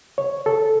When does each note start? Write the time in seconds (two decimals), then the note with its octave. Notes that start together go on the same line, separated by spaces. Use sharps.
0.18 C#5
0.46 A4